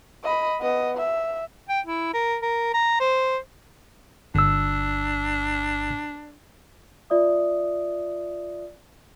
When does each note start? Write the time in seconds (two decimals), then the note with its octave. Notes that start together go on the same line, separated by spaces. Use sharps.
0.24 D#5 B5
0.61 B3 D#5
0.97 E5
1.69 G5
1.86 E4
2.13 A#4
2.42 A#4
2.74 A#5
3.00 C5
4.35 G1 D4 E6
7.10 F4 D5 E5 D#6